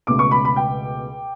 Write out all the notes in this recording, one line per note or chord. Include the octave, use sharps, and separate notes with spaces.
C#2 B2 A3 D6
C#6
B5
B5
G5